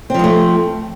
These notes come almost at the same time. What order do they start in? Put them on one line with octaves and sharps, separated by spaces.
C4 F3 G#3 A3